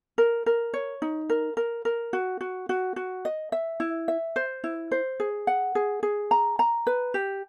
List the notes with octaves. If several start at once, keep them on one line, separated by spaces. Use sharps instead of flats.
A#4
A#4
C#5
D#4
A#4
A#4
A#4
F#4
F#4
F#4
F#4
D#5
E5
E4
E5
C5
E4
C5
G#4
F#5
G#4
G#4
A#5
A#5
B4
G4